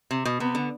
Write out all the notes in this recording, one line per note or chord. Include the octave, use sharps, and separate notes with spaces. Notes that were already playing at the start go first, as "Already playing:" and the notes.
C3
B2
C3 B3
D3